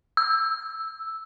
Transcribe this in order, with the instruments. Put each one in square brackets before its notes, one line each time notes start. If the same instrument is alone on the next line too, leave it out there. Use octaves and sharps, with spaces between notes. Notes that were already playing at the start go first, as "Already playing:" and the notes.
[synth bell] E6